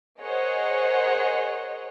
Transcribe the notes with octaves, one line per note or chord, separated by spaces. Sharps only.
G#4 A#4 C5 C#5 D#5 F#5